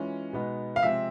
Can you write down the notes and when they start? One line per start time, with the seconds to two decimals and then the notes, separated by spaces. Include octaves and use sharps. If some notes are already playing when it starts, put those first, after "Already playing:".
Already playing: E3 G#3 C#4 F4
0.33 B2 G#3 B3 D#4
0.76 F5
0.83 C3 F3 G#3 C4 E5